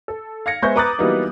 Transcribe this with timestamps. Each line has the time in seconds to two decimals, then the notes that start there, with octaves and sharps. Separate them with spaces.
0.08 A4
0.46 F5 G#6 A#6 C#7
0.62 G#3 B3 C5 E5 C#6 G6
0.76 B4 A#5 D6 D#6 F#6 A6
0.98 E3 F#3 G3 A#3 B3 D#4